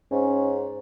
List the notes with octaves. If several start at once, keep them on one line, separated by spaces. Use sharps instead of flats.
G#2 C#4